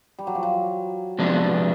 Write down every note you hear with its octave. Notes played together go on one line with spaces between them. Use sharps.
G3
F#3
F3
F#3
C3 F3 G#3 B3 D4